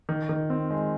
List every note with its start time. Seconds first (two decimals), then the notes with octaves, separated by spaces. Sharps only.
0.09 D#3
0.29 D#3
0.50 C4
0.71 G#3